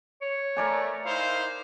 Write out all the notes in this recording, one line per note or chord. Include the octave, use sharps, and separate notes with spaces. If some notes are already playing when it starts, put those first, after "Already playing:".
C#5
A3 A#4 D5 G#5
D#4 E4 C5 F5